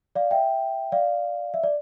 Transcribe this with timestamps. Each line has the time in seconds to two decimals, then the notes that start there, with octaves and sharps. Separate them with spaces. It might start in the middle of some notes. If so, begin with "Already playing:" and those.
0.15 D5 F5
0.31 E5 G5
0.92 D5 F5
1.54 E5
1.63 D5